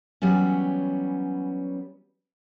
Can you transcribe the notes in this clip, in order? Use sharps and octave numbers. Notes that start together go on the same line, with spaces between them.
E3 F#3 G3 B3 C#4